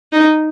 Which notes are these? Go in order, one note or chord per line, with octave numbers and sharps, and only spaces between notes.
D#4